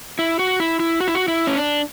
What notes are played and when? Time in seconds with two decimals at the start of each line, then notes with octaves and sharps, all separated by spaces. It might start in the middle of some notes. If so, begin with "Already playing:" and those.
0.19 E4
0.39 F#4
0.60 E4
0.80 E4
1.01 F#4
1.08 E4
1.15 F#4
1.28 E4
1.47 C#4
1.56 D4